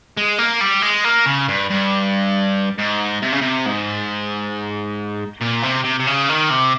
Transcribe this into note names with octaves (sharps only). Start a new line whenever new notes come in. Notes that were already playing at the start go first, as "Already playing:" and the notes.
G#3
A#3
G3
G#3
A#3
C#3
G2
G2
G#2
C3
C#3
C3
G#2
A#2
C3
C3
C3
C#3
D#3
C3